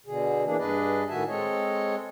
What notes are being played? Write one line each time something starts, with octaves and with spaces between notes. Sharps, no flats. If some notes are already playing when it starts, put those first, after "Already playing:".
B2 D3 G#4
E3 A#3 D4 G#4
G2 D4 G#4 B4 D5 D#5
A2 D#3 F#4 E5 G#5 A5
G#3 C4 A4 C#5 D#5